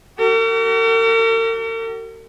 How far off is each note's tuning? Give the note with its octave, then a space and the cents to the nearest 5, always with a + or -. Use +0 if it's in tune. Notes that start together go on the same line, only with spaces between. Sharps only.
F#4 +45 A#4 -45